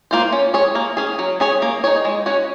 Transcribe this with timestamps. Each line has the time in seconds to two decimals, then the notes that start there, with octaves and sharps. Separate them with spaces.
0.11 A#3 F4 C5
0.33 C#4
0.54 G#4 C#5
0.75 A#3
0.97 C#4 G#4
1.19 F#3
1.40 C#4 G#4 C#5
1.62 A#3
1.84 D#4 G#4 C#5
2.05 G#3
2.26 C#4 F#4 C#5